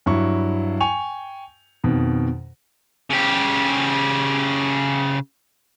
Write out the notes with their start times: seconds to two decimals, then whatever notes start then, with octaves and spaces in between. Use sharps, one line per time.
0.06 G2 F#3 E4 C#6
0.81 G5 G#5 C#6 F7
1.84 F2 B2 D#3
3.10 C#3 G4